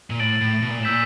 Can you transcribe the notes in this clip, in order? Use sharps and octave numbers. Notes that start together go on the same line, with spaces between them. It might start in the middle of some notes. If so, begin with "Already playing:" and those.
A#2
A2 A6 D7 F#7
A2
B2
A#2
A2
A#2 E6 G6 B6 E7